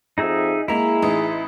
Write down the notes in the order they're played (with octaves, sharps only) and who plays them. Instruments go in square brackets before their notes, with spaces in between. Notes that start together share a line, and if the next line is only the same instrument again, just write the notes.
[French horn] F2 [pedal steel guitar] D#4 G#4 E5
[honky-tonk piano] G#3 A#3 [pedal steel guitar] E4 A#5 [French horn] G#4
[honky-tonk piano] A1 D#4 D#6